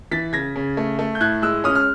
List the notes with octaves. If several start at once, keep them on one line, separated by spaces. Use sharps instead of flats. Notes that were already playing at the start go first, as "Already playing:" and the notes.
E3 A6 B6
C#3 G#6 A#6
C#3
A3
A3
G6
A2 F#6 G#6
G#3 E6 F#6
C#4 D#6 F6
F6